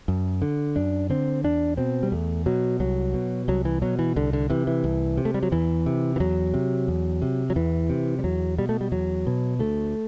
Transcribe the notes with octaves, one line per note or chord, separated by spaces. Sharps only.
F#2
D3
F#2 D4
D3 C4
E2 D4
B2 C4
G3
E2 A3
B2 F#3
C2 F#3
B2
C2 F#3
E3
B2 F#3
E3
C2 D3
D3
C3 E3
E3
C2
C3
A3
G3
F#3
E2 E3
C3
E3
E2 F#3
C3
E2
C3
F#3
E2 E3
C3
G3
E2 F#3
B2 G3
A3
G3
E2 F#3
B2
D2 A3